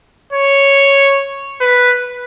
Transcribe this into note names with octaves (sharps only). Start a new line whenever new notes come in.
C#5
B4